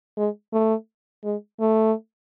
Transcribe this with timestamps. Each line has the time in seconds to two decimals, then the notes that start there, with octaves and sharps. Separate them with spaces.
0.17 G#3
0.53 A3
1.24 G#3
1.60 A3